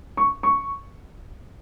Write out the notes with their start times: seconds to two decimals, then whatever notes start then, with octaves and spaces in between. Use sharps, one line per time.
0.17 C#6
0.43 C#6